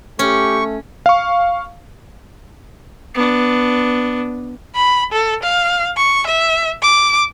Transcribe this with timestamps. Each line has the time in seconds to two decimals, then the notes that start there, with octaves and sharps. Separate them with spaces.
0.19 A3 C#4 G4 C#6
1.06 F5 C#6
3.15 B3 D4
4.76 B5
5.13 A4
5.43 F5
5.97 C#6
6.27 E5
6.82 D6